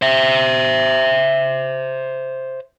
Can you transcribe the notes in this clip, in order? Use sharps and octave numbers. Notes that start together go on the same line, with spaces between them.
C5 E5